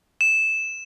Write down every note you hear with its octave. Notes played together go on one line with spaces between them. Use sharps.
E7